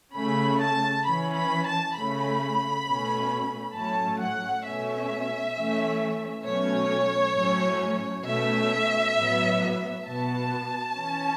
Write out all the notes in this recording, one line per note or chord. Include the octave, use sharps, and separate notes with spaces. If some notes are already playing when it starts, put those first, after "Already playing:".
C#3 A3 C#4 B5
A5
E3 C#4 B5
B5
A5
C#3 A3 C#4 B5
B2 A3 C#4
A2 F#3 A3 C#4 A5
F#5
B2 A3 C#4 E5
E3 A3 C#4
B2 F#3 A3 C#4 C#5
A2 F#3 A3 C#4
B2 A3 C#4 E5
A2 F#3 B3
B2 B3 A5
E3 C#4